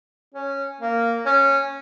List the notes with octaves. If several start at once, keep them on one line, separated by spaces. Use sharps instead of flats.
C#4
A#3
C#4